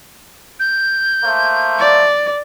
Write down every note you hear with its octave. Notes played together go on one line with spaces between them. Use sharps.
G6
A3 A#3 C5
D5